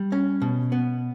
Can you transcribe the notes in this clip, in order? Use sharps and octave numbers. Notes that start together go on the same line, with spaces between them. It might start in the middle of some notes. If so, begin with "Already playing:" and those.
Already playing: G3
C#4
B2
B3